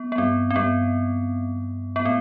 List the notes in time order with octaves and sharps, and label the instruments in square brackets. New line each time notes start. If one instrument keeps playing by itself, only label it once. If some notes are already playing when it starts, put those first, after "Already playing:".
Already playing: [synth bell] B3
B3
[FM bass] G2 [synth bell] C4
[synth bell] C4
[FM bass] G2 [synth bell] B3
[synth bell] B3
[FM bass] A2 [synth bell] C4